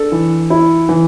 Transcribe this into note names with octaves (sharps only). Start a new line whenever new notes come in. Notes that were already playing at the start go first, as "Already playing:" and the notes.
Already playing: D4 A4
E3
E4
E3